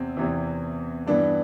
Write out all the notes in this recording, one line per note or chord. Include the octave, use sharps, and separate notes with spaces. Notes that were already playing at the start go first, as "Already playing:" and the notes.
Already playing: E2 C3 C4
E2 C3 E3
G2 E3 B3 D4